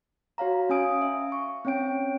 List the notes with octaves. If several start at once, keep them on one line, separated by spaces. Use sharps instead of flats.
F#4 C#5 F5 A#5
C#4 F5 G#5 D#6 D7
E5
C#6
C4 C#4 C#5 G5 D7